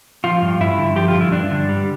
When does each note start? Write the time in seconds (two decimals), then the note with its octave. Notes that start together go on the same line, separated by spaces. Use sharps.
0.24 F3 F4
0.42 G2
0.61 G2 E4
0.78 D3
0.96 F3 G4
1.08 F4
1.15 G2
1.20 E4
1.32 G2 D4
1.51 D3
1.69 G3